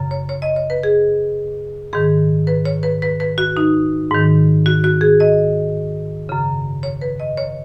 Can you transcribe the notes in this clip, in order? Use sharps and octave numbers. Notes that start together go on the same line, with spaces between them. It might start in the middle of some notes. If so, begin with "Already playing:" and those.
Already playing: F#2 C#3
C#5
C#5
D#5
C#5
B4
G#4
G#2 D#3 G#4
B4
C#5
B4
B4
B4
F#4
D#4
G#2 D#3
F#4
F#4
G#4
D#5
F#2 C#3
C#5
B4
D#5
C#5